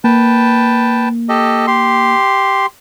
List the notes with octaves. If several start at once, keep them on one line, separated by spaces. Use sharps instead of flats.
A#3 B4 G5 A5
G4 A4 D#5
G4 C6